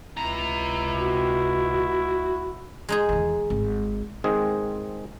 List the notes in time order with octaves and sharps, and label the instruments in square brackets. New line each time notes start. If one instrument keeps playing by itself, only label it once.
[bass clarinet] C#2 [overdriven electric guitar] C3 A#5 [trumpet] E4
[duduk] F#4
[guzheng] G#3 D#4 G#4
[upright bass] E2 D#3
G#1
[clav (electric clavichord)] G#2 D#3 G#3 C4 G#4